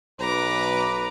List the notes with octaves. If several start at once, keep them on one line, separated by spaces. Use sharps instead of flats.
B1 B4 A#5 D6